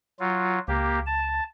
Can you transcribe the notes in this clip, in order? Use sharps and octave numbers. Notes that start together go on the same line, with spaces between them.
F#3 F4
C#2 A#3 G4
A5